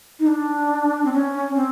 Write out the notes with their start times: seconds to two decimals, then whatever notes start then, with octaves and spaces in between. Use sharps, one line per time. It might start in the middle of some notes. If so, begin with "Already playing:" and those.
0.20 D#4
0.27 D4
1.05 C4
1.13 C#4
1.56 C4